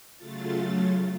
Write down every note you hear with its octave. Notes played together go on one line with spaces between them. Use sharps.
C#3 F#3 A3 F4 A6